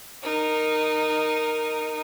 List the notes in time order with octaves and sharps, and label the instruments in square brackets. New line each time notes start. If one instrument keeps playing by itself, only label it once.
[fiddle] D#4 A#4